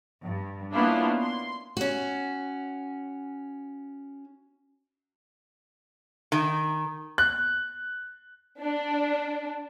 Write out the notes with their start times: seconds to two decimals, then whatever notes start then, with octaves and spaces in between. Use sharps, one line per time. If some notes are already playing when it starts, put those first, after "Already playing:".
0.23 G2
0.73 A#3 B3 C#4 D4 E4 F4
1.22 C6
1.77 C#4 F#4
6.32 D#3
7.18 F#6
8.60 D4